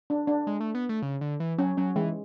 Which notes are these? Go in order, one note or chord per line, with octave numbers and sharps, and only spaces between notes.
D4
D4
G#3
A3
B3
A3
C#3
D3
E3
F#3 C#4
F#3 C#4
E3 G#3